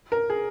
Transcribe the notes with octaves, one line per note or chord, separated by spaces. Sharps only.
A#4
G#4